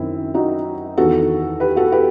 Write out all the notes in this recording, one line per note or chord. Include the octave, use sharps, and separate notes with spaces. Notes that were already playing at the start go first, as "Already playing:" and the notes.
Already playing: F#2 D#3 C4 E4
D#4 F#4
E2 D#3 F#4 A4
G4 B4
F#4 A4
G4 B4